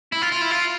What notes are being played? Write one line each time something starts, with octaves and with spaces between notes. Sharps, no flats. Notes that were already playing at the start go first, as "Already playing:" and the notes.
E4
F4
F4
E4
F4